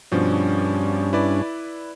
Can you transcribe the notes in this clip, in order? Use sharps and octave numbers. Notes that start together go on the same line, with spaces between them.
G2 B2 F3 C#4 D4
E4 B4 D5